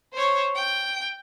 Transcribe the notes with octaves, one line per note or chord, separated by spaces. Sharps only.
C5 C#5
G5